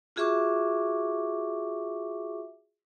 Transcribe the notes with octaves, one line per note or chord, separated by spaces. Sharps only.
F4 F#4 G#4 E5 C#6 D6